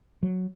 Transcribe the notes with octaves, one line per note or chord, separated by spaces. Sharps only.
F#3